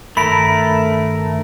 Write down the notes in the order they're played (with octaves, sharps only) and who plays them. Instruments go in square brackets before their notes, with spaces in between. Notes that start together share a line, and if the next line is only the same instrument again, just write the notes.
[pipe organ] G2 D#3 [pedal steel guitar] A3 A#4 [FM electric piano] B5